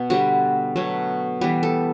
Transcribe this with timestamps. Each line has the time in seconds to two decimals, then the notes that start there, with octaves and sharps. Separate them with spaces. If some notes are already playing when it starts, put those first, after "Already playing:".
Already playing: B2
0.10 D3 G3 B3 F#4
0.76 B2 F#3 A3
1.41 E3 G3 B3 G4
1.63 A4